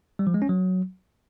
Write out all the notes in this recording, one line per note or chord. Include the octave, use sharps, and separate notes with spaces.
G3
F3
G#3
C#4
F#3